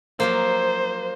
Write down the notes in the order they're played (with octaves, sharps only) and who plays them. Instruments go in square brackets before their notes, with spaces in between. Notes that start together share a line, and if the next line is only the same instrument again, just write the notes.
[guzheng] F3 F#3 A#3 [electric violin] C5